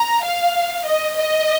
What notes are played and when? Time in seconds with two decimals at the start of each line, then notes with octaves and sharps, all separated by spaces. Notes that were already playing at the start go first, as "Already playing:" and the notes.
Already playing: A#5
0.24 F5
0.86 D#5
1.17 D#5